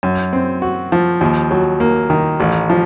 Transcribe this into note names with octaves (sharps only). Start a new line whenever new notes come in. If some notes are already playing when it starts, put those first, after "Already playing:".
F#2
C4
F#4
F3
D#2
F#3
A#3
D#3
A1
F3